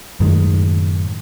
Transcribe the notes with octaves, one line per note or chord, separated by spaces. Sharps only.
F#2 A2 D#3 G#3